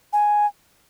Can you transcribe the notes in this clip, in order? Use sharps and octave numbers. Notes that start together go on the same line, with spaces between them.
G#5